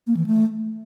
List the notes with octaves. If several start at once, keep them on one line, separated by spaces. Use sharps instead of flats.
A#3
E3
A3